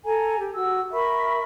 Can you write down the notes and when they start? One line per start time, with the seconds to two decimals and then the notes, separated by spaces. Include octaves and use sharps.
0.05 A4 G#5 A#5
0.39 G4
0.54 F#4 E6
0.92 A#4 E5 B5 C#6